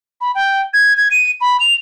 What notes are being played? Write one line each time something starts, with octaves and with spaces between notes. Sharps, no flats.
B5
G5
G#6
G#6
D#7
B5
F7